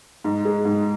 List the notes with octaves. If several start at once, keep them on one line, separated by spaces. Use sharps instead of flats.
G#2
G#3
G#2